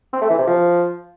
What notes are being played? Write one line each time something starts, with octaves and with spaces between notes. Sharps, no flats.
C4
A3
E3
C3
F3